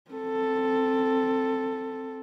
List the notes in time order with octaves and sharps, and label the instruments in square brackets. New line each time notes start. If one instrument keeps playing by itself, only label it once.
[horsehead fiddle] C4 A4